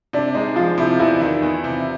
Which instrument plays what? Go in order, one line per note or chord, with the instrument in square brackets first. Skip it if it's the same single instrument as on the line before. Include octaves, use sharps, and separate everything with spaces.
[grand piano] C3 [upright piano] D4
[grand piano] G#3 [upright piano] D#4
[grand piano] F3 [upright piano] F4
[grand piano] C3 [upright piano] E4
[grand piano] E2 [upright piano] E4
[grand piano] D#3
E2
C3